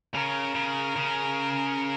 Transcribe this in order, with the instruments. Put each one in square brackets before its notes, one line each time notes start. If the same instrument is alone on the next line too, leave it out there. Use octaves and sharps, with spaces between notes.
[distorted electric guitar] C#3 [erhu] A#4
[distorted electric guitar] C#3
C#3